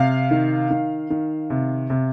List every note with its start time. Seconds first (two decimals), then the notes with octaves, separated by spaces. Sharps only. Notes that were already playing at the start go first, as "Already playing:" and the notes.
Already playing: C3 F5
0.31 D#3
0.70 D#3
1.10 D#3
1.50 C3
1.90 C3